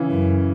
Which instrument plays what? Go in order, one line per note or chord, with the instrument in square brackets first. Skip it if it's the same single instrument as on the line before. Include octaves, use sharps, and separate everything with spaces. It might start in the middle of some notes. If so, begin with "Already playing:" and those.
Already playing: [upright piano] C#3 E3
[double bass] F#2